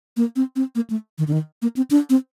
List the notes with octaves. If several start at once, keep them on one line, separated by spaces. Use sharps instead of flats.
A#3
C4
C4
A#3
A3
D#3
D3
D#3
A#3
C4
D4
C4